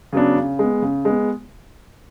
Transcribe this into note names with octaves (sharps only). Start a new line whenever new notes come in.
C#3 F#3 B3 D4
C#3
G#3 B3
C#3
G#3 B3